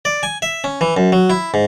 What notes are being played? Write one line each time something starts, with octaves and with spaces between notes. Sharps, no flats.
D5
G#5
E5
C#4
E3
F#2
F#3
E4
G#2